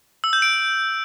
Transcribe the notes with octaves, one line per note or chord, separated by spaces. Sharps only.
E6
G6
D7